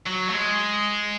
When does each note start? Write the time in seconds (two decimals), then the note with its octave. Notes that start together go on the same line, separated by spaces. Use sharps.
0.07 F#3
0.30 A3
0.34 G#3